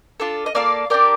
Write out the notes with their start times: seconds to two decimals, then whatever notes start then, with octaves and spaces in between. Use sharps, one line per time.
0.20 D4 F4 A4
0.46 D#5
0.55 A#3 F4 A4 D5 F5
0.90 D4 G4 A#4 D5